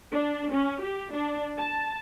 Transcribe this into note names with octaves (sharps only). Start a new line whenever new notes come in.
D4
C#4
G4
D4
A5